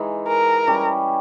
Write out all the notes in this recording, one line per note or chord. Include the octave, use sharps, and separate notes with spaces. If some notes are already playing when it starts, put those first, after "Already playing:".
Already playing: E3 G#3 D#4
A#4
G3 C#4 E4 G4